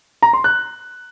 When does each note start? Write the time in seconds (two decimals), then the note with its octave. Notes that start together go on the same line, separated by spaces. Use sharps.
0.22 A#5
0.33 C6
0.44 F#6